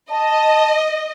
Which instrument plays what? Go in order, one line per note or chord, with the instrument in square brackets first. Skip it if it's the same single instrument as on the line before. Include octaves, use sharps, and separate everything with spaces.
[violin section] D#5 [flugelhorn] A5